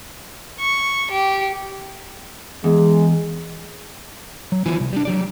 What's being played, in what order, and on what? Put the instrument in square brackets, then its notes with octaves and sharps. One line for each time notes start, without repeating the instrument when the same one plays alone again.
[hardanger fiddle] C#6
G4
[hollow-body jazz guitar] E2 [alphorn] G#3
[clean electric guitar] F#3
E3 B3 E4 F4 G#5
C2
G3 D4
F#3 G3 D5